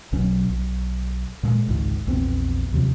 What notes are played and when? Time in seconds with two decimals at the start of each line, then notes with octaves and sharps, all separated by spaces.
0.12 B1 B2 F#3 C#4
0.49 B1
1.43 A#2 G#3
1.68 G#1 C#2 G#2
2.07 A#1 E2 B3 C4
2.72 D#2 C3 F3